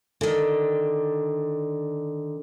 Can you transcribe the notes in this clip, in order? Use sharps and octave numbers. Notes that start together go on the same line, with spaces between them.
D3 D#3